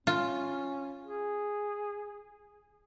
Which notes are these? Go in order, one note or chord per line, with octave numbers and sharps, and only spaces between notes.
C#4 F4
G#4